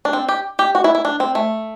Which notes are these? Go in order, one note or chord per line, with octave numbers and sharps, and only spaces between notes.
D4
C4
G4
G4
F#4
E4
E4
D4
C4
A3